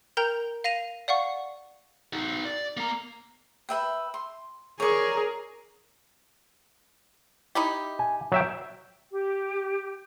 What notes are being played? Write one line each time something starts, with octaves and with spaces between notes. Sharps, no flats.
A#4 G5 A#5 G6 F7
F5 A#6 D#7 F7
D5 F5 F#5 C#6
D#4 F#4
D5
A#3 A#5
B4 E5 G5
C6
G#4 A#4 C#5 D5
D#4 E4 G4
G#5
F#3 E5 G5
G4